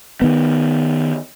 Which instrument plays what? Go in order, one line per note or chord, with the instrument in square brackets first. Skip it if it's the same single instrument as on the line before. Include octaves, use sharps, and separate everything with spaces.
[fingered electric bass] D#3 B3